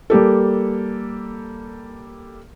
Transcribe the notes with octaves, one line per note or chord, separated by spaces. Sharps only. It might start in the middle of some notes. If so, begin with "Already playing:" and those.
G3 A#3 G4 A4